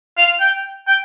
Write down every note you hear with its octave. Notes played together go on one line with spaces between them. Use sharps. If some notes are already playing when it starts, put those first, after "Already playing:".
F5
G5
G5